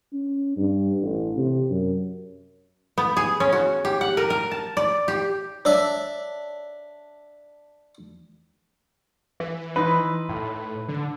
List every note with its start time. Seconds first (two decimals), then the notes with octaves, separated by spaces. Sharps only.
0.13 C#4
0.57 G2
1.02 A1
1.37 C3
1.70 F#2
2.98 B3
3.17 G#4
3.40 C#4
3.53 F#4
3.85 G4
4.01 F#5
4.17 A#4
4.30 A#4
4.51 A5
4.77 D5
5.08 G4
5.65 D4 C#5 E5
9.40 E3
9.76 D#4 E4 B4 C6
10.29 A2
10.88 D3